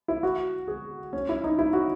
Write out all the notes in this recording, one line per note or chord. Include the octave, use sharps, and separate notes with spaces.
E4
F#4
G#4
C#4
E4
D#4
E4
F#4